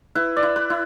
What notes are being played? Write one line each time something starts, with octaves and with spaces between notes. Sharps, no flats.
E4 B4
D5
E4
B4
E4